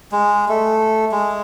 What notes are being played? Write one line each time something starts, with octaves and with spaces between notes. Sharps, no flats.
G#3
A3
G#3